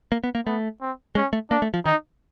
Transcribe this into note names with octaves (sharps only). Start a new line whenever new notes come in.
A#3
B3
A#3
A3 B3
C4
G#3 C#4
A3
A#3 D4
A3
F3
D#3 D#4